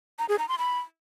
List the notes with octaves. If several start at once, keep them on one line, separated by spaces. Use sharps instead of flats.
A#5
G#4
A#5
C6
B5